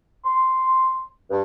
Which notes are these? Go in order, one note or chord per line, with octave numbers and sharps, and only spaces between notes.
C6
G2